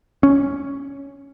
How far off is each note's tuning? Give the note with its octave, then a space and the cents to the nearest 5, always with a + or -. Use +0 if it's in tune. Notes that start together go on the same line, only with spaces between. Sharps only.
C#4 +5